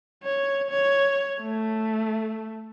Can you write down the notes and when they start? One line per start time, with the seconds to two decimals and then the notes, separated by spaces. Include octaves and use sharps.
0.23 C#5
0.70 C#5
1.42 A3